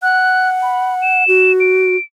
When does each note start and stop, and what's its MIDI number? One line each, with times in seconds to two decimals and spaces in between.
0.02 1.24 78
0.02 0.49 90
0.62 0.94 83
1.02 1.52 100
1.28 1.96 66
1.60 2.02 98